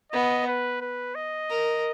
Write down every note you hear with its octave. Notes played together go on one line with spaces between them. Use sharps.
B3 D#5
B4
B4
D#5
A#4